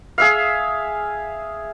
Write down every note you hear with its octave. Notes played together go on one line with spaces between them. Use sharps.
G#4 E5 F5